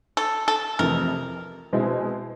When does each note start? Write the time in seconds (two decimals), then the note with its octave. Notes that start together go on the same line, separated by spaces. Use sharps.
0.17 A4
0.48 A4
0.79 F2 C3 E3 A3 A#4
1.73 B2 G#3 C4 E4